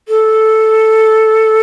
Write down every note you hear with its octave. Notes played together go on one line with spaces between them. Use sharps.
A4